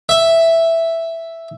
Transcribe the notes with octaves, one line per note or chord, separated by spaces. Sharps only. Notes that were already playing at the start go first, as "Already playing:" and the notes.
E5